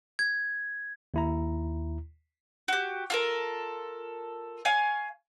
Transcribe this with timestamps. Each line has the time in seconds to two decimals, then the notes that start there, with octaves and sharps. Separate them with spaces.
0.19 G#6
1.14 D#2 E4 A#5
2.68 F#4 G4
3.10 F4 A4 A#4
4.65 C#5 F5 G#5